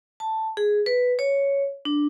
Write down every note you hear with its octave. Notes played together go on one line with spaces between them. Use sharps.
A5
G#4
B4
C#5
D4